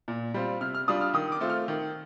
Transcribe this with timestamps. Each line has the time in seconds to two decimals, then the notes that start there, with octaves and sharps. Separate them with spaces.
0.08 A#2
0.34 G3 C4 F4
0.61 C3 F6
0.75 F6
0.88 G3 D4 F4 D#6
1.01 F6
1.14 D#3 D#6
1.32 D6
1.41 A3 C4 F4
1.50 F6
1.68 D#3